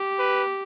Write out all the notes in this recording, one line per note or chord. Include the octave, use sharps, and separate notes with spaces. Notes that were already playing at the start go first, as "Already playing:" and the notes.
Already playing: G4
B4